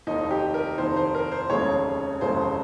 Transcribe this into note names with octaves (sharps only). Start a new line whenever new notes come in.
F1 D#2 D#3 D#4
G4
A#4
F1 D#2 D#3 C5
C5
A#4
C5
F1 D#2 C#3 G#3 C#5
F1 D#2 C#3 G#3 C5